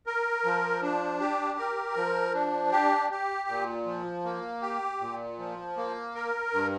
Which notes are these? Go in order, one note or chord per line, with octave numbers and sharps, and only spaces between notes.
A#4
F3
D4
G4
A#4
F3
D4
G4
G4
A#2
F3
A#3
G4
A#2
F3
A#3
A#4
G2